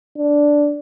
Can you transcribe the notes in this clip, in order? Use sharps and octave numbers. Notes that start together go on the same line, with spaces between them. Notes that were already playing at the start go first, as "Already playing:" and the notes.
D4